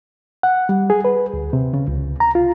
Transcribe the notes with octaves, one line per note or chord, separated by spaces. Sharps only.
F#5
G3
G#4
B4
D2
C3
C#3
C#2
A#5
F4